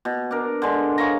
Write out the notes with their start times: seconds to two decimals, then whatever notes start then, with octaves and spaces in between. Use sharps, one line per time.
0.05 B2
0.31 D4 A#4
0.62 D3 G#3
0.98 G#4 C#5 F5 A#5